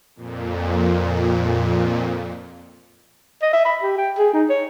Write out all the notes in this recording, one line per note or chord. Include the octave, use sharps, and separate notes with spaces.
F2 A#2
D#5
E5
B5
G4
G5
G#4
D#4
C#5